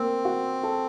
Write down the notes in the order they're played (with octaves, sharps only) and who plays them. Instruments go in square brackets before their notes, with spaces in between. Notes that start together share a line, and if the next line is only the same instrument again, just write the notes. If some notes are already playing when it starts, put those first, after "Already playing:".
Already playing: [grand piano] A#3 [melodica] C4
[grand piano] F#4
A4